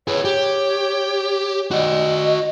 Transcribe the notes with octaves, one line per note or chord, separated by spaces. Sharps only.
G#4 B4 C#5
G4
F#4 D5 D#5